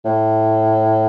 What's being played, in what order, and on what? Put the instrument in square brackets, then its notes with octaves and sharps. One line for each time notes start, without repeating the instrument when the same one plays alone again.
[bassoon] A2